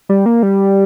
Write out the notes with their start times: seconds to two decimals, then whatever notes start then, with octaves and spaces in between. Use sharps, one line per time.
0.09 G3
0.26 A#3
0.43 G3